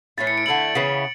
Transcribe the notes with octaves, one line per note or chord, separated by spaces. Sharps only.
A2 E3 A3 E4 A6
C#7
D7
D3 A3 E4 F#7
C#3 E3 B3